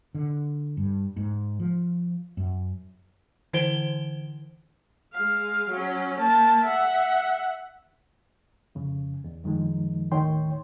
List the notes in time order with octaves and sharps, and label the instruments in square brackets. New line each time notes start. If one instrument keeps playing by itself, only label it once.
[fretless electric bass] D3
G2
G#2
F3
F#2
[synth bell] D3 E3 E4 C5 D7 G7
[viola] G#3 F5
F#3 C#4
A#3 A5
E5 F#5
[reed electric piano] F2 C#3
E2
F#2 D#3 F3 G#3 D#4
D#2 A2 D#3 C#5 G5 C6